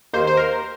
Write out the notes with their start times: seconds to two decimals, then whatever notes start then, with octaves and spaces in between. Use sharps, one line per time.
0.13 D#2 D#3 A#3 C5
0.27 C5
0.37 A#4